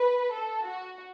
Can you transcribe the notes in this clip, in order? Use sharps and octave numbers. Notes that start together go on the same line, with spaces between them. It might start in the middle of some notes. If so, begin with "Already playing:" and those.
Already playing: B4
A4
F#4